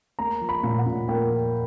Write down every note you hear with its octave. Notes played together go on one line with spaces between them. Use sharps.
A#3 A#5
F3
B5
A#2
F#5
A#2
A#3 G5
F3